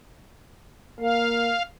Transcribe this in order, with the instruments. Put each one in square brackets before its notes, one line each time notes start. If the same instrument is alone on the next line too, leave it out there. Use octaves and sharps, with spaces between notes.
[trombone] A#3 [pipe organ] F5